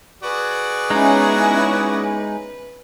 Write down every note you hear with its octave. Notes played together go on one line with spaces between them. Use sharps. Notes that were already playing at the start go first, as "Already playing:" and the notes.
F#4 G#4 B4 D5
G#3 B3 C#4 D#4 E4